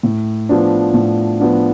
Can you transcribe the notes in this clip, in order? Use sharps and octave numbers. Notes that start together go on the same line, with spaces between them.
A2
F3 B3 D4
A2
F3 B3 D4